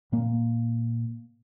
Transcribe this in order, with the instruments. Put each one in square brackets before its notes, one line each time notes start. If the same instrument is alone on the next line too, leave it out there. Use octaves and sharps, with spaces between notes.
[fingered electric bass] A#2 A#3